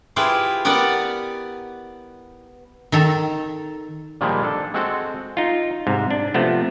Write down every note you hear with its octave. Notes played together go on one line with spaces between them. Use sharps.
E4 F4 G4 G#4 B4 C5
B3 G4 A#4 B4 D5 F#5
D#3 A4 A#5
A#2 D#3 F3 G3 G#3 A#3
D4 A4
G#3 C4 F#4 A4
D#4 F4
G#2 C3
D4
C3 F3 A3 B3